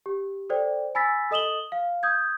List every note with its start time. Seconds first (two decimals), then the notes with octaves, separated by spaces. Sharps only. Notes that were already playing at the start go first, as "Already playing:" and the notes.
0.06 G4
0.50 A4 C5 D5 G5
0.95 G#5 B5 E6 A6 B6
1.31 A4 D#5 D#6 E7 F#7 G7
1.72 F5
2.03 D#6 G6 G#6